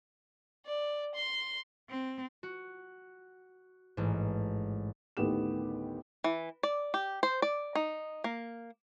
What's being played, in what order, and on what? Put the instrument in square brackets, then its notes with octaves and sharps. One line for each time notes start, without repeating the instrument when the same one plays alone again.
[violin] D5
C6
[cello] C4
[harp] F#4
A1 G#2
[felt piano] A1 D2 D#3 B3 G4 E7
[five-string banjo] E3
D5
G4
C5
D5
D#4
A#3